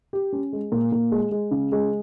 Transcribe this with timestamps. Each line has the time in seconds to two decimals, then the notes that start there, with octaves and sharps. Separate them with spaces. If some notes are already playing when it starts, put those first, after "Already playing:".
0.13 G4
0.33 C#4
0.53 G#3
0.72 A#2
0.92 A#2
1.11 G#3
1.31 G#3
1.51 C#3
1.72 G#3